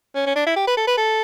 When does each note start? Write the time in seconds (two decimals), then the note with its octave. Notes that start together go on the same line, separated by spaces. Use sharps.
0.15 C#4
0.26 C#4
0.36 D4
0.46 E4
0.56 G4
0.67 B4
0.77 A4
0.87 B4
0.97 A4